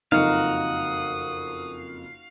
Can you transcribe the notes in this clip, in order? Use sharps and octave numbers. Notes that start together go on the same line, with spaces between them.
F#1 F2 D#4 F#4 F5 D#6